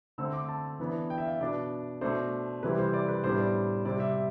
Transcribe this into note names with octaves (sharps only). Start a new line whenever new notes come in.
D3 A3 C4 E6
D6
A5
E3 B3 D4
G5
E5
F5
B2 B3 D4 D5
B2 A3 D4 C5
C3 E3 G3 C4 B4
C5
D5
B4
A2 G3 B3 D4 C5
D5
C3 G3 C4 D5
E5